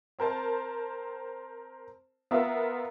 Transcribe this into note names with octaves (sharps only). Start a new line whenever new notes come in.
C4 A#4 C5 A5
B3 F4 A#4 E5 F#5